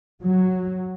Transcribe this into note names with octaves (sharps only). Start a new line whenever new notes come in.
F#3